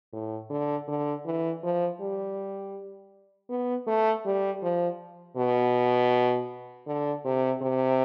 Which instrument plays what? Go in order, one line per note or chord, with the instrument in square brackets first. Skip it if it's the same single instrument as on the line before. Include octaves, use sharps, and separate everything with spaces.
[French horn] A2
D3
D3
E3
F3
G3
B3
A3
G3
F3
B2
D3
C3
C3